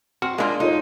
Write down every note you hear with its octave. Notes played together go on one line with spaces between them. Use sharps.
C4 F#4 F6
G#3 A#3 D4 E4 F4
D#4 F4 A4 C#5